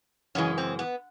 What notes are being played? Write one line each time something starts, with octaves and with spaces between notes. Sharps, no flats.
F#2 C#3 E3 G#3 C#4
C4
B3